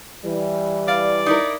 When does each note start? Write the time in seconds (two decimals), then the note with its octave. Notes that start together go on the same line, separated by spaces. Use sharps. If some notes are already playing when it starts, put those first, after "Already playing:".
0.25 E3 G3
0.88 D5 F5
1.26 D#4 E4 A#4